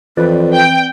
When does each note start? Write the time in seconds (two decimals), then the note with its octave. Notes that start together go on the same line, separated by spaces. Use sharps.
0.17 F2 E3 C4 B4 D5
0.54 G5